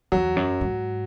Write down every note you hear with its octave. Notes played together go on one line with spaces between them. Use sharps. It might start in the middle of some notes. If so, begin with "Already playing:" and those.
E2 F#3
F#2
G#2